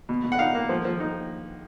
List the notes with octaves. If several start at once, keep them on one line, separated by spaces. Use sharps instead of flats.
B2
B2
F#5
D#4 F5
A#3
F3
F3
D#4